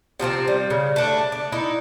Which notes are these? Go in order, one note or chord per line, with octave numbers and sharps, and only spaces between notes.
C3 F3 A3 C4
G3
C#3
A3 D4
D4
D#4 E4